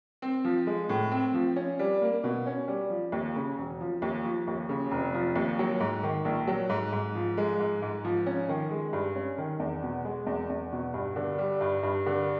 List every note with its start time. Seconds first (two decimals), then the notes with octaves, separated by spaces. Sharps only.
0.22 C4
0.45 F3
0.67 G#3
0.89 A2
1.11 C4
1.34 F3
1.56 C#4
1.79 G3
2.02 A#3
2.24 B2
2.46 C#4
2.68 G3
2.90 F3
3.12 D#2
3.36 C#3
3.58 E1
3.81 F3
4.02 D#2
4.24 F3
4.47 D#2
4.69 C#3
4.91 F1
5.14 F3
5.36 D#2
5.59 F#3
5.80 G#2
6.03 D#3
6.25 A#1
6.47 F#3
6.69 G#2
6.92 G#2
7.15 F3
7.37 G#3
7.59 G#2
7.82 G#2
8.05 F3
8.26 C#4
8.49 D#3
8.71 G#3
8.93 G2
9.15 C#4
9.38 D#3
9.60 E2
9.83 B2
10.05 G#3
10.27 E2
10.50 E2
10.72 B2
10.94 G2
11.16 D3
11.38 G3
11.61 G2
11.83 G2
12.06 D3